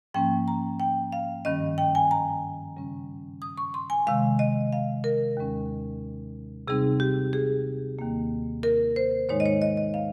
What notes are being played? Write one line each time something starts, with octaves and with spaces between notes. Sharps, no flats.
G#2 F3 A#3 C#4 G5
A#5
G5
F5
G2 D#3 G3 C#4 D#5
G5
G#5
A#5
C#3 G3 C#4
D#6
C#6
C6
G#5
C3 D#3 G#3 F5
D#5
F5
A#4
D#2 D#3 G#3 C#4
C3 G3 C4 D#4 G#4
G4
G#4
D#2 D#3 A#3
A#4
C5
G#2 D#3 G#3 D#4 C#5
D#5
C#5
D#5
D#5
F5